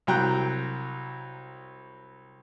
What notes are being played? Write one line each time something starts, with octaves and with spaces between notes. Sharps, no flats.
C2 F#3 G5 A#5 F#6